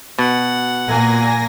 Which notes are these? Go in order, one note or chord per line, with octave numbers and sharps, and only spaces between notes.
B2 F#5
A#2 A#3 G#5 A#6